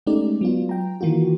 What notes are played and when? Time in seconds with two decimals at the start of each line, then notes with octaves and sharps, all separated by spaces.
0.07 G#3 A3 C#4 D#4 G4 D5
0.41 F#3 B3 F4
0.69 G5 A#5
1.01 D#3 E3 A#3 F4 F#4